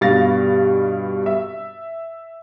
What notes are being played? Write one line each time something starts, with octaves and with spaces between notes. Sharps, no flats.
G2 B2 G3 F5 A6 A#6
E5